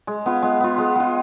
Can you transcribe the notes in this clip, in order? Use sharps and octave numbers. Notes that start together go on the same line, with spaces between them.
G#3
B3 F4
G#3
B3 F4
G#3
B3 F4